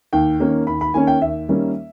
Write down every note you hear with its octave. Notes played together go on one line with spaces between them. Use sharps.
D#2 G5
D#3 A#3 C#4
D#2 B5
B5
D#3 A#3 C#4 G#5
G5
D#2 E5
D#3 G3 A#3 C#4